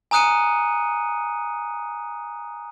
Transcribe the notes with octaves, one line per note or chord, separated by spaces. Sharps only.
G#5 A#5 D#6 F#6 C#7 D#7